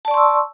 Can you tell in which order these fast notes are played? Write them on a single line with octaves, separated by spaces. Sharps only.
A5 D5 C#6 C6 E6